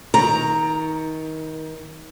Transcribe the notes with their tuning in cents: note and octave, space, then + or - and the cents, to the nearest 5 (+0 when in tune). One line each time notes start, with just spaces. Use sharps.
D#3 +25 A#5 +0